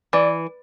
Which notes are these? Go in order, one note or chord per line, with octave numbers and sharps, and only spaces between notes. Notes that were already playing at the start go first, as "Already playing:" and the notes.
E3 D5